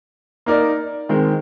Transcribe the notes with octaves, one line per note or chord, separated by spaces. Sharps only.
A#3 D#4 A#4 D5
D#3 G#3 C4